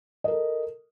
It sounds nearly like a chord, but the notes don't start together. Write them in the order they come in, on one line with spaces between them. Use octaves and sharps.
D#5 A#4 A4